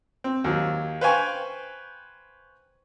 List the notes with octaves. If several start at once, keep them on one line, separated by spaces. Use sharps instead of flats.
C4
D#2 F#3
B4 C5 F5 G5 G#5 C#6